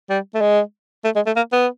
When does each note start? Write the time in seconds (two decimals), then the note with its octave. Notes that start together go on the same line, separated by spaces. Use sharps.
0.09 G3
0.35 A3
0.41 G#3
1.05 A3
1.16 G#3
1.26 A3
1.36 A#3
1.53 B3